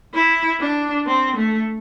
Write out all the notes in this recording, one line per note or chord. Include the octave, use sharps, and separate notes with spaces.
E4
D4
C4
A3